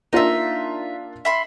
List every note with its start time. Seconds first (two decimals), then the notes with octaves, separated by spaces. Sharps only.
0.13 A#3 D4 D#4 F4 E5
1.25 E5 B5 C6